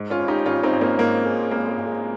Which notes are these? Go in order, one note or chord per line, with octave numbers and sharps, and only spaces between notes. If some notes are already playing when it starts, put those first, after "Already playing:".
Already playing: G#2
C#4 F4
G#1
D#4 G4
G#1 C#4 F4
C4 D#4
G#1
A#3 C#4
G#2 A#3
G#2 G#3
G#1 A#3
G#3
G#1
G#3